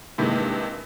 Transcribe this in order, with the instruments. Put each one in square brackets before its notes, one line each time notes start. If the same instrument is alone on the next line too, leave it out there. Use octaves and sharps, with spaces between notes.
[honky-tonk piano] G2 C3 D#3 E3 G#3 A#3